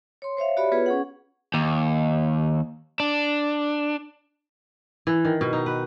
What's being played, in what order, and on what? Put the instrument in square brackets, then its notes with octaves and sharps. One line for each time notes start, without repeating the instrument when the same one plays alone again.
[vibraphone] C#5 C6
C5 C#5 E5 F5
F#4 G4 C#5 D5 E5 B5
B3 F4 F#4 G#4 B4 C#5
C#4 G#4 F#5
[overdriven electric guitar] D#2
D4
[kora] E3
D#3
B2
D#4
B4